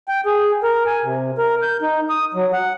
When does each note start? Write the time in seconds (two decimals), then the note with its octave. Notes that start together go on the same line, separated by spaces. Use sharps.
0.08 G5
0.26 G#4
0.63 A#4
0.86 G#5
1.03 C3
1.38 A#4
1.62 G6
1.82 D#4
2.09 D#6
2.34 F#3
2.53 F#5